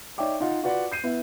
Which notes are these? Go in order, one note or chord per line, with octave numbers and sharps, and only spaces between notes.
D#4 C#5 D5 E5 G5 D6
D#4 F4 F5 F#5
F4 F#4 B4 D5 F#5
G6 C7 D#7
B3 E4